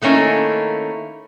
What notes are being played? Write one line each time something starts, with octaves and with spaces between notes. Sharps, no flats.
D#3 A3 A#3 C#4 E4